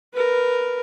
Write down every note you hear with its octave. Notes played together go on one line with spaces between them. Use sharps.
A#4 B4